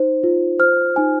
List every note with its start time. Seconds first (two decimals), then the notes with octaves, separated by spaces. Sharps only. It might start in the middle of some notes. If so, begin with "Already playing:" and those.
Already playing: D#4 C5
0.23 F4
0.59 C5 F6
0.96 D#4 G#5